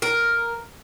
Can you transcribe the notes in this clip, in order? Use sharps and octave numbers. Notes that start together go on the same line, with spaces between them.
A#4